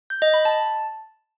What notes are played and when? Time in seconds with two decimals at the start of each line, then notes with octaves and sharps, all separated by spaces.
0.10 G6
0.22 D#5
0.34 B5
0.45 A5